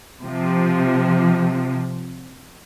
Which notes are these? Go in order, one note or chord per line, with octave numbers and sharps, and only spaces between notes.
C3 F3